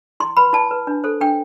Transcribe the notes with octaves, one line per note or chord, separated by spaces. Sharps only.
E4 C6
B4 B5
E4 A5
B4
D4
A4 C5
D4 G5